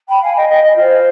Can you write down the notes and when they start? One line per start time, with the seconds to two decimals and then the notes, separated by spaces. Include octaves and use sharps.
0.08 G5 B5
0.21 F5 G#5
0.35 D#5 G5
0.48 D#5 G5
0.62 D#5
0.75 F4 C5